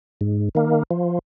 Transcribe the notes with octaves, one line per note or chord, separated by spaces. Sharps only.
G#2
D#3 A#3
F3